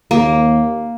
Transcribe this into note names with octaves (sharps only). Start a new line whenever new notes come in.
D#2 A#3